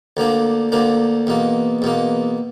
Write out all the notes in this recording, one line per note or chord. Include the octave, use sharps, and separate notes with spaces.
D2 D3 A#3 D4
D2 D3 A#3 D4
E2 B2 A#3
E2 B2 A#3